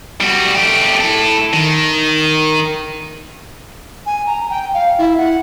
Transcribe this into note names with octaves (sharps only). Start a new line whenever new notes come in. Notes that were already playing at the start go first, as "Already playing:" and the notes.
G3 F#4
A3 G4
E4 A4
D#3
G#5
A#5
G5
F5
E4
F#5